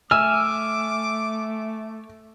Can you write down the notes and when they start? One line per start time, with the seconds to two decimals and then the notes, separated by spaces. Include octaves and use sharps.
0.11 A3 E5 G#5 D6 E6 F6